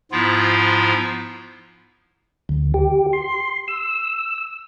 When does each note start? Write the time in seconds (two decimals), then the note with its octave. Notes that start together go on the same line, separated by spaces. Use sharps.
0.12 G#2 F3 B3 E4 F4
2.49 D2
2.74 G4
3.13 C6
3.68 E6